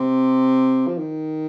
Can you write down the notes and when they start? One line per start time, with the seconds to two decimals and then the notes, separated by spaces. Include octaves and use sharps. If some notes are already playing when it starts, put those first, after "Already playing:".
Already playing: C3
0.87 F3
0.98 D#3